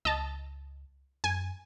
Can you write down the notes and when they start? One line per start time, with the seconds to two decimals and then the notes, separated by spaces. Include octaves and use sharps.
0.05 C#2 D#5 A5
1.24 F#2 G#5